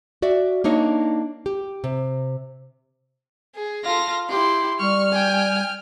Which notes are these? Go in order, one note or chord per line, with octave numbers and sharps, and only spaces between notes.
F#4 D5 E5
A#3 D4 D#4 C#5
G4
C3
G#4
F4 A4 F5 A#6
E4 G4 C6
G3 C#6 F6
G5 G#5